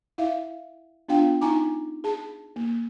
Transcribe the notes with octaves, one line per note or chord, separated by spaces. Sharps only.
E4 E5 F5
B3 D4 F4 F5 G5
D#4 G#5 A#5 D6
G#4 A5
A#3